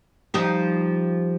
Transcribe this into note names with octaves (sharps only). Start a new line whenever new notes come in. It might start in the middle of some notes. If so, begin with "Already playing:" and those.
F3 G3 D#4